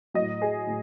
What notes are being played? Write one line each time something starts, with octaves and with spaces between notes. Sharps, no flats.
A2 F#3 D#5
G#4
A2